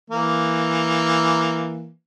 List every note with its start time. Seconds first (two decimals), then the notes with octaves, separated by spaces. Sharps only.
0.10 E3 A#3